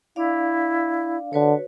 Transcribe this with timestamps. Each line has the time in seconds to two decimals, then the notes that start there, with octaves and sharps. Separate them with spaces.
0.16 D4 E4 D5 F5
1.33 D3 F#4 B4 C#5